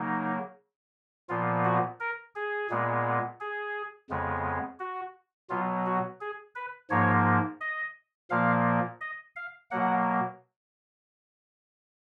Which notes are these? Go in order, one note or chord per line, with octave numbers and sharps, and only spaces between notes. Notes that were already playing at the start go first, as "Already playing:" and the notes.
Already playing: C#3 F#3 A#3 D#4
A#2 F3 B3 F4
F#4
A#4
G#4
A#2 G#3 B3
G#4
F2 C#3 G#3 B3
F#4
B2 F#3 B3 F4
F#4
G#4
B4
G#2 F3 A#3 C#5
D#5
A#2 F3 A#3 F5
D#5
F5
B2 F#3 A#3 F#5